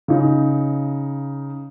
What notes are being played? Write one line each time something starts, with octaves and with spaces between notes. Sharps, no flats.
C#3 D#4